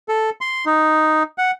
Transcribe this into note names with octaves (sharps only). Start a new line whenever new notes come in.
A4
C6
D#4
F#5